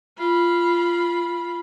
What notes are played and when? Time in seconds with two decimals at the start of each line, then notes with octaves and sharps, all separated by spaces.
0.18 F4 B5